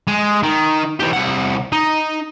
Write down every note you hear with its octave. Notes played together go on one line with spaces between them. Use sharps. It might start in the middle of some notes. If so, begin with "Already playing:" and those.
G#3
D#3
E3 G4
C2 F#5
D#4